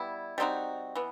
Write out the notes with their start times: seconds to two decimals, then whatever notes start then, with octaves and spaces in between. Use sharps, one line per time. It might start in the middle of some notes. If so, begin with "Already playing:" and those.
Already playing: G3 B3 E4
0.38 G3 C4 D#4 F#4
0.95 E3 B3